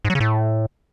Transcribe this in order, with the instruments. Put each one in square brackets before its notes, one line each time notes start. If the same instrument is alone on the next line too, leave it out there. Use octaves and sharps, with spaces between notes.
[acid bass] G#2
F#3
C#3
A2